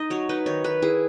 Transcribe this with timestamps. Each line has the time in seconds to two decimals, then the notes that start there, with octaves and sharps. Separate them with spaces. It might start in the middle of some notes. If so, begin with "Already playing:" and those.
Already playing: D#4 D#5
0.10 F#3 C#5
0.29 D#4 B4
0.46 D#3 C#5
0.64 D#3 B4
0.82 E4 G#4